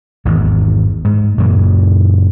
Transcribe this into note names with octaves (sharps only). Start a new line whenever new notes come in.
G#1 E2 G#2
G#2
F#2 A#2 C#3 E3